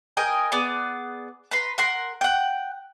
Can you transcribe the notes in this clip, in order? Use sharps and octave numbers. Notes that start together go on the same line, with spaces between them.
A#4 D#5 G5 G#5
B3 G#4 D5
B4 A#5 C6
A#4 F#5 C6
F#5 G5